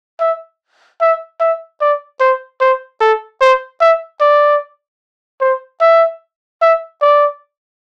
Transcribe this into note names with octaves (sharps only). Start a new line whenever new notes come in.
E5
E5
E5
D5
C5
C5
A4
C5
E5
D5
C5
E5
E5
D5